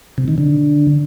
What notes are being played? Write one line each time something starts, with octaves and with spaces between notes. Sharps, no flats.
C3
D#3
D3